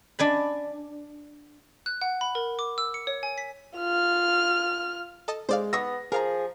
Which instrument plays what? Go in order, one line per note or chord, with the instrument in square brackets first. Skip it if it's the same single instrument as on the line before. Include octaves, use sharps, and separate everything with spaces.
[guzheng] D4 G#5 B5
[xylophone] F#6
F#5
B5
A#4
D6
E6
C#7
C#5
G#5
B6
[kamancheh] F4 F6
[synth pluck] A4 D#5 A5
[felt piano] G#3 [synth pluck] C5 D5 F5
[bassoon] B3 [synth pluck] C#6 D#6 E6 [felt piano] A#6
[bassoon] F3 [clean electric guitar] G#4 [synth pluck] A#4 F5 A#5